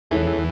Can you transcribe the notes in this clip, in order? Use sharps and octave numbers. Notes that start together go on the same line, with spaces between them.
E2 E3 G#3 C#4 E4 A4